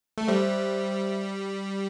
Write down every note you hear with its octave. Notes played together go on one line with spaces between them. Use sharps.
A3
G3 C5 E5